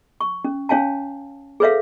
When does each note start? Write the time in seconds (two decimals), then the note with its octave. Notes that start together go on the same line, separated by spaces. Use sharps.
0.21 C#6
0.44 C#4
0.69 C#4 C#5 F5 G#5 A5
1.60 G#4 A4 B4 C#5 E5 F5